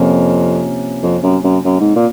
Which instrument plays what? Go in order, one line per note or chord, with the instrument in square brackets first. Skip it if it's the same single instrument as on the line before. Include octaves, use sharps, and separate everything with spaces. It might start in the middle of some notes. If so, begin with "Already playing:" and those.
Already playing: [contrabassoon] F2 [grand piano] C3 F3 A#3 C#4
[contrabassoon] F2
F#2
F#2
F#2
G#2
A#2